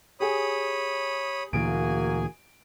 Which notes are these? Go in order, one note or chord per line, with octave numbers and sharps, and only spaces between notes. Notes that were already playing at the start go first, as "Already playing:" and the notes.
G4 G#4 C#5 B5 D#6
D2 A#2 E3 A#3 F#4 G#4 G#5 D7